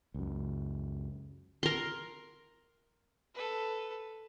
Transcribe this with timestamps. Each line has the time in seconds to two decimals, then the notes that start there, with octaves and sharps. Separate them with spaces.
0.14 C#2 F#2
1.63 A#4 C6
3.34 A4 B4